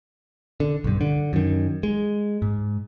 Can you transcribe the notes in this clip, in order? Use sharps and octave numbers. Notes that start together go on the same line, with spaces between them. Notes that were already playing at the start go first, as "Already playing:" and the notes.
D3
B1 G2
D3
F#2 D#3
G#3
G#2